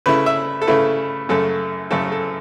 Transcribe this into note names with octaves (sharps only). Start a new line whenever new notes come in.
C#3 A3 E4 B4
E5
A4
C#3 A3 E4 B4
F#2 C#3 A3 A4
F#2 C#3 A3 A4
A4